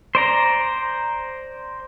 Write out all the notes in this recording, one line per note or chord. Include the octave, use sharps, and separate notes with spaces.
C5 D5 A#5